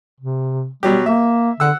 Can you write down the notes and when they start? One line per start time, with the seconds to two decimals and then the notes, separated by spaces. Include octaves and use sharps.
0.20 C3
0.83 B2 F#3 G3 G4
1.06 A#3 E5
1.60 D3 F#5 E6